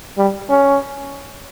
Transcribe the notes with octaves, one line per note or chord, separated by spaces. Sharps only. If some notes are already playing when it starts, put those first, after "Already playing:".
G3
C#4